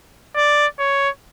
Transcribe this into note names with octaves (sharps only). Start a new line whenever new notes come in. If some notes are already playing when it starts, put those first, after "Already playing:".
D5
C#5